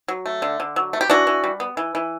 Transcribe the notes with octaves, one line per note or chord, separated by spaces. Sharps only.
F#3
A3
D3
D3
F#3
A3
G4
E3 D4 F#4
E3
G3
B3
E3
E3